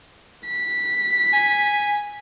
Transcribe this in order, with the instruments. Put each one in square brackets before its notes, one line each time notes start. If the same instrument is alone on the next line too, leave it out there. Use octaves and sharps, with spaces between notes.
[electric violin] B6
[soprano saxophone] G#5